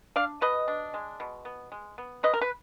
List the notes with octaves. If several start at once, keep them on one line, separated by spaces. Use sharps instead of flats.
D4 D5 F5
B2 B4 D#5
D4
G#3
B2
B3
G#3
B3
F3 B4 D#5
A#4
B4